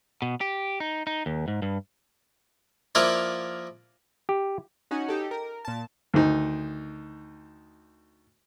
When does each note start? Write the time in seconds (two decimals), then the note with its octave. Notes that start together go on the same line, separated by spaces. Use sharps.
0.22 B2
0.41 G4
0.80 D#4
1.07 D#4
1.26 D#2
1.48 G#2
1.62 G2
2.95 F3 A#3 E4 F4 D5
4.29 G4
4.91 C#4 D#4 F#4 F#5 G#5
5.09 D#4 G4 A4
5.31 A#4
5.65 A#2 A5
6.14 D2 D#3 D#4